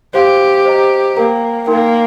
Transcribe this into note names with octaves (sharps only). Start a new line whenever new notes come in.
G4 C5 F5 C6
C5 D#5 A#5
A#3 A#4 G5 A#5
A#3 D#4 A#4 G5 C6